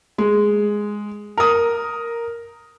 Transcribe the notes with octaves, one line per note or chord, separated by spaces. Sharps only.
G#3
A#4 D#6